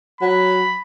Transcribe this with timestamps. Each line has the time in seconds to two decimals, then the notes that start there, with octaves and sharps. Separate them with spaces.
0.21 F#3 B5